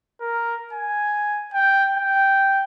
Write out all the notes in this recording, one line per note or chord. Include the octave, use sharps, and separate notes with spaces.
A#4
G#5
G5
G5